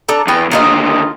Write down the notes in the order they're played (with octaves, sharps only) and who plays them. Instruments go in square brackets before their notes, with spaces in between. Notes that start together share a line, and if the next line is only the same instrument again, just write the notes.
[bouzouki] D4 A4 A#5
[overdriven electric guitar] E2 [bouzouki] B3 G5
[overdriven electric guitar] D#2 D3 [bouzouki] D#3 F4 D#5